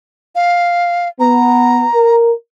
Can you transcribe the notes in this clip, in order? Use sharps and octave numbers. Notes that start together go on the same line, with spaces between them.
F5
B3 A#5
A#4